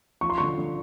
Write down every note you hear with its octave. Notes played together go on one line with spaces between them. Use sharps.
F3 C#6
C6
D3 C#6
D3